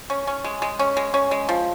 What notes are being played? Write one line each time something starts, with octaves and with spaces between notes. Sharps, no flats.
C#4
C#4
G#3
G#3
C#4
G#3
C#4
G#3
F3